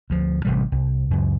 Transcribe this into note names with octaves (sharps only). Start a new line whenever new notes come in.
D2 F3
A1 C3 G3
C2
C#2 F#2